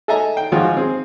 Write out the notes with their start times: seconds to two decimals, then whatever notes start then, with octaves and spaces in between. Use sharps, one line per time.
0.08 A4 D#5 E5 G#5 A#5
0.37 G5
0.52 G#1 F3 F4 F#4 G#4
0.77 C4 G#4